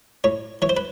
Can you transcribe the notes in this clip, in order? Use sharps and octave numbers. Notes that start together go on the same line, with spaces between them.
A2 C#5
E3 C#5
C5
B4